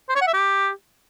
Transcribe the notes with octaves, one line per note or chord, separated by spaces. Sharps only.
C5
C#5
F#5
E5
G4